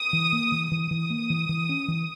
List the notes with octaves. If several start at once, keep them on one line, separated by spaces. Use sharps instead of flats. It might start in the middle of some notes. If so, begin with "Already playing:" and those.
Already playing: D#6
E3
A#3
E3
E3 D#6
E3
A#3
E3
E3
C#4
E3